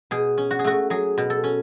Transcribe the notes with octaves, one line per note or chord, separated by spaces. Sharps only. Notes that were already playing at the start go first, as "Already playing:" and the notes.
B2 G#4
C#4
F#4
G#4
A3 F#4
F#3 G#4
B2
A4
C#4